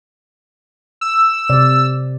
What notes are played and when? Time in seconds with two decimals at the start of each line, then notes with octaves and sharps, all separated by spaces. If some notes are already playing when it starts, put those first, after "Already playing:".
1.01 E6
1.50 C3 D5